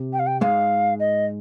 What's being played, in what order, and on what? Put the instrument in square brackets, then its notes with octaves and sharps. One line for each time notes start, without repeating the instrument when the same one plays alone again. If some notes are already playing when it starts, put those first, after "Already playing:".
Already playing: [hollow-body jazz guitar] C3
[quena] G5
F5
G5
[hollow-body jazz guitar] G#2 G#3 [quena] F5
[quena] D#5